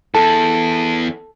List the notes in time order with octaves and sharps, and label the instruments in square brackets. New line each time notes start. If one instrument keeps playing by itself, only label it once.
[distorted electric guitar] E2 [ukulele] A4 [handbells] A5